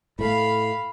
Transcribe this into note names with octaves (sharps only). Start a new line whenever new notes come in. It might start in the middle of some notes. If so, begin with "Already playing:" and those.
A2 A3 F5 B5